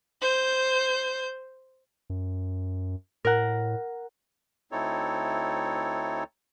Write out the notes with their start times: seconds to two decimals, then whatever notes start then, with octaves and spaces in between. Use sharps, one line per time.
0.22 C5 G6
2.10 F#2
3.25 A2 A#4 F#5
4.72 D2 C4 D#4 E4 A4 C#5